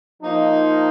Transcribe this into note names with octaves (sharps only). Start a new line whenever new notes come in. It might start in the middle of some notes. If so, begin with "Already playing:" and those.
F3 A#3 D#4